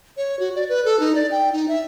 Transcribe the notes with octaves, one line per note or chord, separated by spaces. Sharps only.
C#5
F#4
D5
B4
A4
D#4
D5
G5
D#4
E5